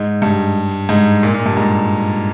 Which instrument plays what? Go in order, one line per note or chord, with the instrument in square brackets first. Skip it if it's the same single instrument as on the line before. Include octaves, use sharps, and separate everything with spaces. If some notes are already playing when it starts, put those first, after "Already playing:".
Already playing: [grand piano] G#2
G2
G#2
A#2
A#2
G2
G#2